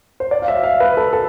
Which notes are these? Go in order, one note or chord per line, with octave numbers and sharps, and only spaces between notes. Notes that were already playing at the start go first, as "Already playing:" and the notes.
C5
D5
F5
E5
F5
B4
A4
A4